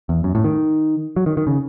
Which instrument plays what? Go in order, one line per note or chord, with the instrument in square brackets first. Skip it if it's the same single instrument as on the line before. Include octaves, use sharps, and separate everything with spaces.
[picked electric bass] E2
F#2
A2
D#3
F#3
D#3
D#3
C#3